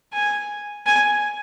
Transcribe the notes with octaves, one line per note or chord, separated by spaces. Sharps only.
G#5
G#5